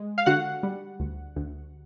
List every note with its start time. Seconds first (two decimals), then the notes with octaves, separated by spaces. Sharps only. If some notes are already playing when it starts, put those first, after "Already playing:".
Already playing: G#3
0.18 F5
0.26 D3 F#4 F#5
0.63 G3
1.00 D2
1.36 D2